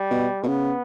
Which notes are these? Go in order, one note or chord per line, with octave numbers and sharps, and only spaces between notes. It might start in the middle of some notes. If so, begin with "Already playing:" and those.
Already playing: G3
B2
B2
C#3 B3